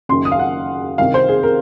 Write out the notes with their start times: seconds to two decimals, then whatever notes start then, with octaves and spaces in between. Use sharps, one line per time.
0.09 F#1 F#2 D#3 C6
0.25 D#6
0.32 F5
0.39 F#5
0.98 C2 C3 D#3 F5
1.14 C5
1.28 G#4
1.43 A#4